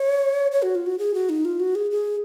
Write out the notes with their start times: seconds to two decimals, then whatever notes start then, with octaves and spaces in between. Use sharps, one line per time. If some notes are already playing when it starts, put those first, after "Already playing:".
Already playing: C#5
0.52 C#5
0.62 F#4
0.75 F4
0.86 F#4
0.99 G#4
1.14 F#4
1.29 D#4
1.45 F4
1.60 F#4
1.75 G#4
1.91 G#4